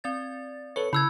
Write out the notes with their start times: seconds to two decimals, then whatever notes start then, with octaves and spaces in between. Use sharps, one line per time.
0.04 C4 D5 A6
0.76 A4 B4 C#5 C#7
0.93 C#3 E4 B5 E6 G#6